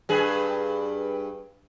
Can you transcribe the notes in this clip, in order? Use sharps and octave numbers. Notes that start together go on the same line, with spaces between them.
G2 G#4 B4